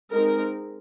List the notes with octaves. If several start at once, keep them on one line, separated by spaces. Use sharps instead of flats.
G#3 C4 D#4 A#4